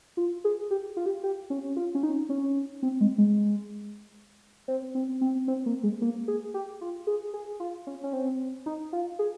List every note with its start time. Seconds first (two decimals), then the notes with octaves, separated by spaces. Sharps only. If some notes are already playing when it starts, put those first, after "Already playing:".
0.17 F4
0.44 G#4
0.71 G4
0.97 F4
1.06 G4
1.24 G4
1.50 C#4
1.76 F4
1.95 C#4
2.03 D#4
2.29 C#4
2.83 C4
3.01 G#3
3.18 G#3
4.68 C4
4.95 C4
5.21 C4
5.48 C4
5.66 A#3
5.83 G#3
6.02 A#3
6.28 G#4
6.54 G4
6.81 F4
7.07 G#4
7.34 G#4
7.60 F4
7.87 C#4
8.03 C#4
8.13 C4
8.66 D#4
8.93 F4
9.19 G#4